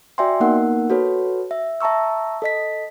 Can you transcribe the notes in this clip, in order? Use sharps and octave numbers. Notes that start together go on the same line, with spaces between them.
F#4 D5 E5 G5 G#5 C6
A#3 B3 D#4 A#4 F#5
F#4 A4 B4 C#5
E5
E5 A5 A#5 C#6 E6
A4 D#5 B6